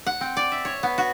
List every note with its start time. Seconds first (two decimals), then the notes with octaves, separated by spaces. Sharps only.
0.07 F#5
0.21 C4
0.37 D5
0.52 E5
0.65 C#5
0.83 B3
0.98 F#4